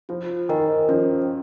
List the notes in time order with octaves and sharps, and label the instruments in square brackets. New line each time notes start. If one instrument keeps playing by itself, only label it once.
[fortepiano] F3 [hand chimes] F4
[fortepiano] D#3 [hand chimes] A#4 D#5 G#5
[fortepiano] F3 [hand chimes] C#4